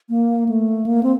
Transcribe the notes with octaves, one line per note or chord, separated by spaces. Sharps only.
A#3
A3
A#3
C4